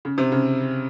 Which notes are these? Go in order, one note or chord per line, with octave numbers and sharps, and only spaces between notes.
C#3
C3
C#3